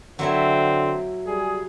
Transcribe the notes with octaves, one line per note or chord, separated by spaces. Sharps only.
D3 F#3 C4 E4 E5
G3 G#4